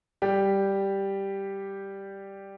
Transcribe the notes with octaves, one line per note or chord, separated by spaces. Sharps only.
G3 G4